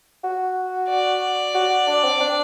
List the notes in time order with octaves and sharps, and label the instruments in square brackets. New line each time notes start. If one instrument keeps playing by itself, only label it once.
[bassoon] F#4
[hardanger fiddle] D5
[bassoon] F#4
D4
C4
D4